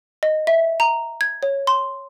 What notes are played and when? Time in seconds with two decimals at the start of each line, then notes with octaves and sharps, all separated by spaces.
0.23 D#5
0.47 E5
0.80 A#5
1.21 G#6
1.43 C#5
1.67 C6